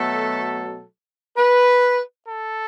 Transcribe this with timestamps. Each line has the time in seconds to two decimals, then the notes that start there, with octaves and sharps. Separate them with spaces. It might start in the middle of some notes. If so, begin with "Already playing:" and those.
Already playing: B2 F#3 A3 A4
1.37 B4
2.25 A4